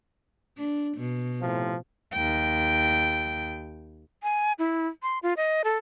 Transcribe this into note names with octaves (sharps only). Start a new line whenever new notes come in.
D4
B2
A2 C3 F3
D#2 G5
G#5
E4
C6
F4
D#5
A4